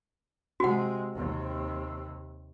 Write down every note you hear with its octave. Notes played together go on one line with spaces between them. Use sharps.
C3 G#3 F#4 F#5
D#2 C3